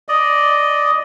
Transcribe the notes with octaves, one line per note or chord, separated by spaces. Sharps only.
D5 D#5